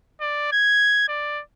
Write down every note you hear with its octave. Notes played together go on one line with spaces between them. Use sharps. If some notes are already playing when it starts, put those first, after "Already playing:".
D5
G#6
D5